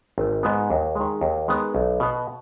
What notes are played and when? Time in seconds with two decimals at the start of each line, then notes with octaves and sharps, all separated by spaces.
0.18 G#1
0.43 G#2 G#3 B3
0.70 D#2
0.95 D#3 G#3
1.21 D#2
1.48 D#3 G#3 B3
1.75 B1
2.00 B2 B3